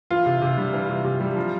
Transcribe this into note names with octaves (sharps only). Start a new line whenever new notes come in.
E3 F4
C3
C3
G3
E3
C3
C3
G3
F3